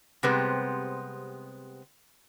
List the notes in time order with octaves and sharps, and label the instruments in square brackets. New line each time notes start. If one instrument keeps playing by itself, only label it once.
[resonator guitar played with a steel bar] C3 G3 G#3 B3 C4